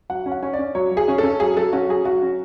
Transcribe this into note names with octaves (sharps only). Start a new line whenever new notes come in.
F#3 F#5
C#4
F#5
C#4
D5
C#4
F#3 C#5
F#3
G#4
C#4
A4
C#4
F#3 G#4
F#3 A4
C#4 F#4
F#3 G#4
F#3 F#4
C#4